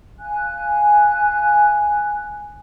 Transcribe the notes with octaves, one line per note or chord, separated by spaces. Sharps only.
F5 G#5 F#6